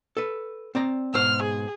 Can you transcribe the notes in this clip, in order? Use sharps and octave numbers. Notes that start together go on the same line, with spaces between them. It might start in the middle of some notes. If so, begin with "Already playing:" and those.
A4 B4
C4 D5 A#5
G#2 B2 C5 F6
G#4